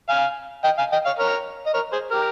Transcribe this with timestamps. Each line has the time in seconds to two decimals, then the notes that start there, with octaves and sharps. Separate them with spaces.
0.09 F5 G#5
0.64 D#5 G5
0.78 F5 G#5
0.92 D#5 G5
1.05 C#5 F5
1.19 A#4 C#5
1.66 D#5
1.74 A#4 C#5
1.92 G#4 C5
2.11 G4 A#4